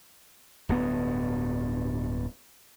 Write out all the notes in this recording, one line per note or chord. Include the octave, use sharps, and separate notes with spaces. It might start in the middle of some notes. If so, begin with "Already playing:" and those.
D1 G2 B3